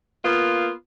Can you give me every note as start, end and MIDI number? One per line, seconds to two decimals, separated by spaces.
0.23 0.70 58
0.23 0.70 59
0.23 0.70 65